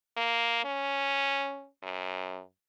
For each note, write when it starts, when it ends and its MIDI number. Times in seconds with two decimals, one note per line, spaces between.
0.17 0.60 58
0.64 1.67 61
1.83 2.41 42